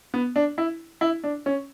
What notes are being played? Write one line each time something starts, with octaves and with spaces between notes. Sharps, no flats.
B3
D4
E4
E4
D4
C#4